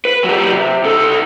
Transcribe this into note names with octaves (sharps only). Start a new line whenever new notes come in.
B4
F#3 G4
C3
B1 A4